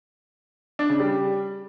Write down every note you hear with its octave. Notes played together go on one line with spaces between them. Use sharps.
D4
C#3
G3